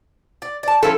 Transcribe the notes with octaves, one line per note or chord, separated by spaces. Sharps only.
D5
D5 A5
F3 C#4 E4 A4